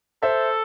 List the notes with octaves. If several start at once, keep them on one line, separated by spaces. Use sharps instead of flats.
A4 C5 E5